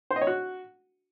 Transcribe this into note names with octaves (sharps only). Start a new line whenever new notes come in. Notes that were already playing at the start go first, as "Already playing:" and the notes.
C5
D#5
C#5
F#4